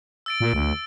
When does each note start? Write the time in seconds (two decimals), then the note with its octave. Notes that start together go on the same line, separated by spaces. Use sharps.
0.26 E6 A6 D7
0.41 A#2
0.54 D2